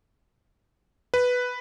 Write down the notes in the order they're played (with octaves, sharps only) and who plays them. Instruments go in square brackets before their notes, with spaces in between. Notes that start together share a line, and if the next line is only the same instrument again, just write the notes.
[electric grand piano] B4